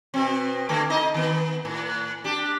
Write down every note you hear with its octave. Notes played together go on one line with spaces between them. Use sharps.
B2 C4
D3 A3 A#3
D#4 D#5
D#3 B3
A2
D4 G4